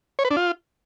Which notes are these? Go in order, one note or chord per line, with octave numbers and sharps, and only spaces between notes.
C#5
B4
D4
F4